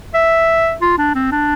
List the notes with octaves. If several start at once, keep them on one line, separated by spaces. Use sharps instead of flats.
E5
F4
D4
C4
D4